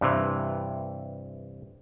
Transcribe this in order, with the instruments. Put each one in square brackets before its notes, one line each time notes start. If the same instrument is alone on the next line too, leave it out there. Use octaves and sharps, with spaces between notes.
[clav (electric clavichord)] G2 C3 E3